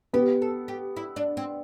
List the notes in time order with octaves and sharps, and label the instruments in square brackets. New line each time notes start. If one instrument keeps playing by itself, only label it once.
[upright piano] B3 [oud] G4
[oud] A4
G4
E4
D4
C4